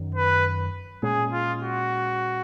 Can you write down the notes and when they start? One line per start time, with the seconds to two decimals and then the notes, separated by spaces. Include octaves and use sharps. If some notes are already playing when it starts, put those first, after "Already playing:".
Already playing: F#2 D#3 F#3
0.15 B4
1.03 A#2 G#3 C#4 G#4
1.32 F4
1.62 F#4